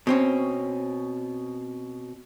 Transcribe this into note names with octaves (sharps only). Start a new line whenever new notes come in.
B2 C4 C#4